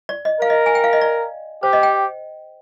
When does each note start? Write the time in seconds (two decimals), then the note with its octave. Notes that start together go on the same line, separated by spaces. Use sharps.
0.09 D5
0.25 D#5
0.40 A#4 F5
0.50 D#5
0.66 G#5
0.75 G5
0.84 F5
0.93 D#5
1.01 D5
1.63 G4 C5
1.73 D#5
1.83 G5